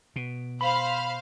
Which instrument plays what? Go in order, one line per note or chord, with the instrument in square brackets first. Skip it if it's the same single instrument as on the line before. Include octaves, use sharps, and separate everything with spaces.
[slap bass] B2
[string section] C5 F5 F6 [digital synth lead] B5